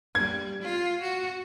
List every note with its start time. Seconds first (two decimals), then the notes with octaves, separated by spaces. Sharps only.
0.15 G3 G#6
0.63 F4
1.02 F#4